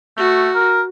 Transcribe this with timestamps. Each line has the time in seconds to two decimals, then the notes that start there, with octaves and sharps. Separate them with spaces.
0.17 A3 F#4
0.55 A#4